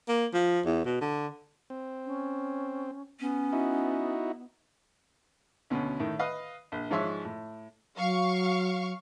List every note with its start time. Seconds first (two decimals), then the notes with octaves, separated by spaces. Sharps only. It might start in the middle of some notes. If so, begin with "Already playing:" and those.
0.09 A#3
0.34 F3
0.65 E2
0.85 B2
1.01 D3
1.70 C4
2.06 C#4
3.20 B3 C#4
3.53 D#4 E4 F#4
5.70 D2 B2 D3 C#4
6.00 A2 D#3
6.19 B4 D#5 F5
6.72 A#1
6.90 G#2 F3 G#3 C#5 E5 C6
7.25 A2
7.97 F#3 F5 C#6